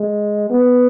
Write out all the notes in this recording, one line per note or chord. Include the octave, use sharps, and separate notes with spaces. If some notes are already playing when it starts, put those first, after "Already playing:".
Already playing: G#3
B3